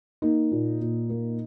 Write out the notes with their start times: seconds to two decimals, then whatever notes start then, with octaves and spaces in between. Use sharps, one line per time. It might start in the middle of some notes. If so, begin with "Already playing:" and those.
0.22 A#3 D#4
0.51 A#2
0.81 A#2
1.10 A#3